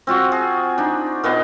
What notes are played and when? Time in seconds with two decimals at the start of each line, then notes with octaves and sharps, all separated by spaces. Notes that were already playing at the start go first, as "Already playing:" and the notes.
0.07 C4 F4 F#4 F#5
0.32 G#4
0.78 D4 D#4
1.23 A#2 B3 D#5 F5